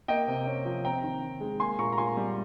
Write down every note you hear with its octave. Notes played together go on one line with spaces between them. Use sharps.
A#3 D#5 G5
C3
C#4
F3
C4 G5 A#5
D#3
D#3
G#3
A#3 G#5 C6
A#2 A#5 C#6
A#5
A#2 G#5 C6
G3